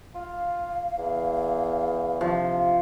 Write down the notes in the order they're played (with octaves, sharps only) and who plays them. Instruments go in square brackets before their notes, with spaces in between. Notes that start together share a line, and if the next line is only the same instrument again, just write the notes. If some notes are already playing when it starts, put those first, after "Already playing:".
[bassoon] F4 [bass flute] F5
[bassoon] E2
[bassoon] C3 [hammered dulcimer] F3